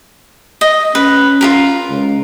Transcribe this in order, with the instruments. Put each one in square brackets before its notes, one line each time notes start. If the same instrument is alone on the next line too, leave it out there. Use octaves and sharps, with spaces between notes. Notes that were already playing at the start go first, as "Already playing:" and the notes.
[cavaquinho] D#5
[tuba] C#4 [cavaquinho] B4
[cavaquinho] F4 G4 A#4
[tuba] C#2